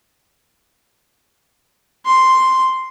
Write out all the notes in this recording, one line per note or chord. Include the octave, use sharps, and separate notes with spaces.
C6